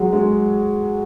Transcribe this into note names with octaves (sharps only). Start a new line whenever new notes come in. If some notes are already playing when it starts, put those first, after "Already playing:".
Already playing: F#3 G#3
G#3